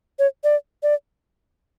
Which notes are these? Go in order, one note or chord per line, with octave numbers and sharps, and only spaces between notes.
C#5
D5
D5